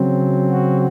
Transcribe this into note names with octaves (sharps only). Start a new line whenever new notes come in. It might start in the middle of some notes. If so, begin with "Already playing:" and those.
Already playing: C#3 F#3 C4
F#4